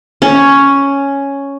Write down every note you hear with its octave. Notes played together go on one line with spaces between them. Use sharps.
C#4